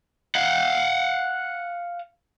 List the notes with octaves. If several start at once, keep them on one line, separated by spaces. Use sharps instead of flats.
F5 F#5